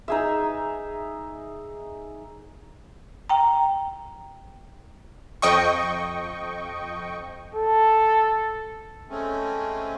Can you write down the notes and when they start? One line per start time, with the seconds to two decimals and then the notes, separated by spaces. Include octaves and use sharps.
0.08 D#4 G#4 E5
3.29 G5 A#5
5.42 F2 D#5 G5 C#6
7.55 A4
9.09 G#3 A3 C4 C#4